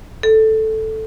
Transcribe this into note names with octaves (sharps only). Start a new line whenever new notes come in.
A4